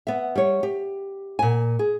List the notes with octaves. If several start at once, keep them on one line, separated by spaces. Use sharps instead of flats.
B3 E5
G3 C#5
G4
A#2 G#5
G#4